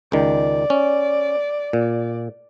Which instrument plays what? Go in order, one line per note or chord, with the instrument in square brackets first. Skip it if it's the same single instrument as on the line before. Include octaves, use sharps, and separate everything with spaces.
[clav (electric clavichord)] C#2 D#3 [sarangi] D5
[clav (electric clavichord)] C#4
A#2